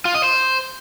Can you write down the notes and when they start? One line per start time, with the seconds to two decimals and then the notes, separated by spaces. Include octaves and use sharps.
0.05 F4
0.14 D#5
0.24 C5